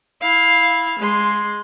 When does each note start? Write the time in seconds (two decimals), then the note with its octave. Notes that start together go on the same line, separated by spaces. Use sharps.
0.21 E4 F5
0.99 G#3 C6